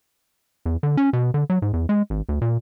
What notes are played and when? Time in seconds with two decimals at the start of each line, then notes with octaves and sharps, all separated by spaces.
0.66 E2
0.83 D3
0.97 C#4
1.13 B2
1.34 D3
1.50 F#3
1.62 G#2
1.73 E2
1.89 G#3
2.10 G#1
2.29 D2
2.41 A#2